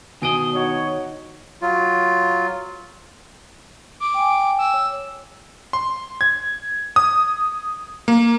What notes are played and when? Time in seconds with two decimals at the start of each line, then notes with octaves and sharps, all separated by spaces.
0.22 B2 D#3 D#5 G#5 D7 D#7
0.55 D#4 F#4 C#5
1.62 F#3 F4
4.00 D6
4.14 G5 G#5
4.59 E6
4.73 C#5
5.73 C6
6.21 G#6
6.96 D#6
8.08 A#3